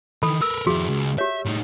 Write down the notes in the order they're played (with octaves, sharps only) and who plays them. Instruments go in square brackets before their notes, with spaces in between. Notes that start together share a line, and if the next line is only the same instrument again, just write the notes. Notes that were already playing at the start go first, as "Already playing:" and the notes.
[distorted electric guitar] D#3 E3 [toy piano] A4 B5
[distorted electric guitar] A#4 B4 [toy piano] E6
[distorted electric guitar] F2 E4 [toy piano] F#4 G#4
[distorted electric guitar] C#2
[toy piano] G4 C#5 [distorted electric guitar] E5
[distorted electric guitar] A2 D#4